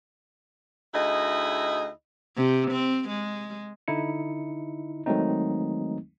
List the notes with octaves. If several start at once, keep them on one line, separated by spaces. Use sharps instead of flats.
D2 D#4 E4 G#4 D#5
C3
C4
G#3
D3 D#4 E4 C#7
D#3 F#3 G#3 A3 C4 D#4